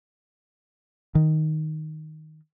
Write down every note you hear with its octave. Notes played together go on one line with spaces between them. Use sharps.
D#3